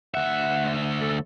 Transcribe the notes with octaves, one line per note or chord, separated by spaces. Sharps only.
D2 E5 F#5
A4